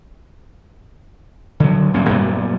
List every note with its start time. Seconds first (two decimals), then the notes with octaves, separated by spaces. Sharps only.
1.60 D3 F#3
1.94 D#1 G2 A#3 C#4
2.09 F#2 A#2 G3 B3